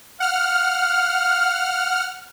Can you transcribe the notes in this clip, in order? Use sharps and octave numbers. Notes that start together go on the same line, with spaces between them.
F5 F#5 F6